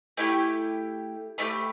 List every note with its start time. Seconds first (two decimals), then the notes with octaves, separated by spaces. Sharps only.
0.17 A3 E4 G4 G5
1.38 A3 D4 G4 B5